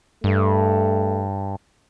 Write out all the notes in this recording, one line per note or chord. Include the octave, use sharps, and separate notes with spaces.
G2 A3